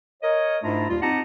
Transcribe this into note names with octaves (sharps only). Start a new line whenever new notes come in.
A#4 C#5 D#5
G#2 A3 D4 E4 F4 A#5
D#2 A#2 G3 F4
C4 D#4 G4 F#5 A5 A#5